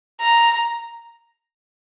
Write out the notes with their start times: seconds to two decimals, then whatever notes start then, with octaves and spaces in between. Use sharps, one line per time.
0.21 A#5